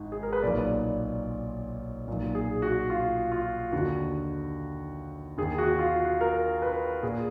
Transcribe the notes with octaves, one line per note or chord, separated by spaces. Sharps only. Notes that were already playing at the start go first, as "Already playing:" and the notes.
Already playing: G#1 G#2
G#4
A#4
B4
B1 A#2 D5
B1 A#2
G#4
F#4
F4
F4
D#2 D3 F#4
D#2 D#3 G#4
F#4
F4
F#4
A#4
B4
A#2 G#4